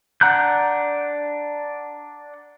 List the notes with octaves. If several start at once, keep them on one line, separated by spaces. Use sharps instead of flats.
D4 F#5 A#5 F#6 G6